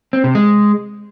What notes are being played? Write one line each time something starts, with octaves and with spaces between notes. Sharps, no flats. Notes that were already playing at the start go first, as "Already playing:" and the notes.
C4
C3
G#3